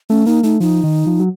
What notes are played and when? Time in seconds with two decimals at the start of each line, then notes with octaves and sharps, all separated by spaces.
0.10 A3 C#4
0.26 A#3 D#4
0.43 A3 D#4
0.60 F3 D#4
0.84 D#3
1.07 F3
1.20 F#3